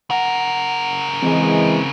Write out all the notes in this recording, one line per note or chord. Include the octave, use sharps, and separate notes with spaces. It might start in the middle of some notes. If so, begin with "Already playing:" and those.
C#3 A#4 F#5
E3 G#3 C4